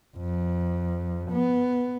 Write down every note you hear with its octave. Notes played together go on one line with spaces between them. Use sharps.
F2
B3